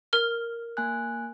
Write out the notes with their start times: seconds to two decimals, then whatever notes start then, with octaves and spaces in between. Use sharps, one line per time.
0.13 A#4 F6
0.77 A#3 G#5 F#6